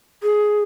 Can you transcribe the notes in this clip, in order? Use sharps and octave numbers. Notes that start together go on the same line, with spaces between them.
G#4